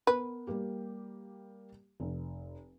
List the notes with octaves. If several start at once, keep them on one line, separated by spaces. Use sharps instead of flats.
B3 A#4 B4
G3 A#3 G4
F1